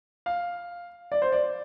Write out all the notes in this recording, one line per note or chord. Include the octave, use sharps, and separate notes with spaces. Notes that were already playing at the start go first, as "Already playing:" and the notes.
F5
D5
C5
D5